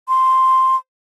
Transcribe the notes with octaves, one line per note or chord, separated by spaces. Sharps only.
C6